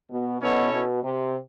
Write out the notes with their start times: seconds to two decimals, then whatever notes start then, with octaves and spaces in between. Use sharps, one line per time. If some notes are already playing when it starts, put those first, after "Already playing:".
0.11 B2
0.42 B2 C#4 E4 A4 C#5
0.73 B2
1.04 C3